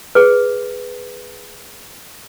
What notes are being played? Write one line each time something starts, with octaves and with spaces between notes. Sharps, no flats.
G#4 B4